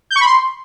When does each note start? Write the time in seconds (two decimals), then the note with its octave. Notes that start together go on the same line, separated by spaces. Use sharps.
0.11 G6
0.16 C#6
0.21 B5
0.26 C6